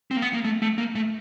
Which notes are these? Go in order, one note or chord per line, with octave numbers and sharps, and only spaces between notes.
C4
A#3
B3
A#3
A3
A3
A#3
A3